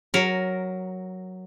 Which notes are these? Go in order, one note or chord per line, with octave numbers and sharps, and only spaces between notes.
F#3 A#4